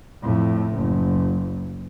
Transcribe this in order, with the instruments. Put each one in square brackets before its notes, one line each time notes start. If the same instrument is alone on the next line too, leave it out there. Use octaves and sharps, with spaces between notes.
[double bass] F2 A2
F#1